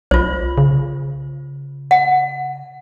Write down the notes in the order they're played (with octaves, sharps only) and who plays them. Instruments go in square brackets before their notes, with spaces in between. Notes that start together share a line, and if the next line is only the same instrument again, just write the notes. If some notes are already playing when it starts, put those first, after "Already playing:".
[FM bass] B1 [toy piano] F4 C5
[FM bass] C#3
[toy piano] F#5